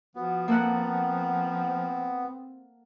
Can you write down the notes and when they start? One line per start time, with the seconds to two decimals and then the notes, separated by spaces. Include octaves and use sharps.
0.16 F3 B3 F#4
0.48 A#3 C4 A4 F#5